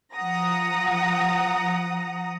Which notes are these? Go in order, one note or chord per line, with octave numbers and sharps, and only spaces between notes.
F3 F#5 A#5 D#6 A#6